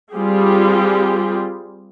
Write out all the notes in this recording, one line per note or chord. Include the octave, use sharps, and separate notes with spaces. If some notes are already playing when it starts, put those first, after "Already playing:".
G3 C4 F4 G4 G#4